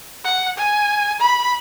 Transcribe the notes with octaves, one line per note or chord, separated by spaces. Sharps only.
F#5
G#5
B5